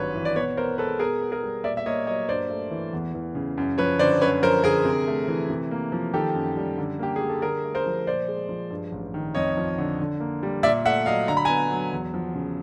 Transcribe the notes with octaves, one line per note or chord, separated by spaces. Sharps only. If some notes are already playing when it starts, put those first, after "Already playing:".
Already playing: G#1 G2 F#3 B4 C#5
E3
D5
B2 B4 C#5
B3 A#4 C5
G#3 A4 B4
B2 G#4 A#4
B3
G#4 A#4
G3
A#2 D5 E5
E5
A#3 C#5 D#5
F#3 C#5 D#5
G2 C5 D5
A3
E3
E2
E3
C#3
F#2
F3 B4 C#5
D3 C5 D5
F#2 B4 C#5
F3 A#4 C5
D3 G#4 A#4
C3
A3
E3
C3
A#3
F3
D#3 G4 A4
F#2
G3
D3
A#3 G4
G3 G#4
A4
D3 G#4 A#4
A3
A#4 C5
F3
A#2 C5 D5
G#3
F3
G2
A1
D#3
F2 C#5 D#5
F3
D3
D3
A#3
G3
A#2 D5 E5
A3 E5 F#5
F#3 D#5 F5
D3 A#5
B5
B3 G#5 A#5
F#3
E2
F3
C#3